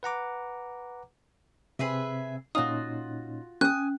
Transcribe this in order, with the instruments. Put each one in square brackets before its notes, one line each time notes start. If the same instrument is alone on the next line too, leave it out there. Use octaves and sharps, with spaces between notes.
[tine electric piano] B4 F#5 A#5 D6
[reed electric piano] C3 C4 [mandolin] G#4 B4 E5
[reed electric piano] A#2 C#4 D#4 [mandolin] F4 F#4 [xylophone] D#6
[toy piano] C#4 [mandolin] G#5 D#6 [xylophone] F#6